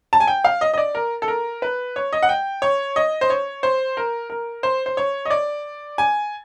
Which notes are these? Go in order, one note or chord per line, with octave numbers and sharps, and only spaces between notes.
A5
G#5
G5
F5
D#5
D#5
D5
A#4
A4
A#4
B4
C#5
D#5
F#5
G5
C#5
D#5
C5
C#5
C5
A#4
A#4
C5
C5
C#5
D#5
D5
G#5